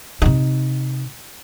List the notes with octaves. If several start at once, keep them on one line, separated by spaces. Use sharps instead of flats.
C3 D#4